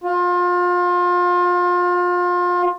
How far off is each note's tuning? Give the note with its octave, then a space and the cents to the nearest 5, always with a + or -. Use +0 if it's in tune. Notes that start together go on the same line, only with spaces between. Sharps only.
F4 +30